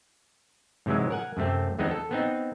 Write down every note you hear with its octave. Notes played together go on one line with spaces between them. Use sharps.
G#2 C3 E3 F#3 G#3
A#4 F#5 G#5
F#2 C3 A3 C4
E2 G#3 B3 C4 D#4
A4
B3 C4 D#4